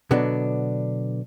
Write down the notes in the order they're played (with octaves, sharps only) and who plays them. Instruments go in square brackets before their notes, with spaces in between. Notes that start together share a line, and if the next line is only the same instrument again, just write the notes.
[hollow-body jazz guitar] B2 D3 F#3 B3 D4